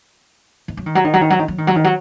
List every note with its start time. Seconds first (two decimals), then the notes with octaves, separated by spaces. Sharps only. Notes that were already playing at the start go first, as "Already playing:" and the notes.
0.68 D#3
0.77 F#3
0.86 D#3
0.95 F#3
1.04 D#3
1.13 F#3
1.21 D#3
1.30 F#3
1.39 D#3
1.48 F#3
1.58 D#3
1.67 F#3
1.76 D#3
1.84 F#3